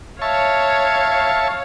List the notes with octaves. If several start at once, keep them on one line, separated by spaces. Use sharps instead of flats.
C#5 E5 F5 A5 C#6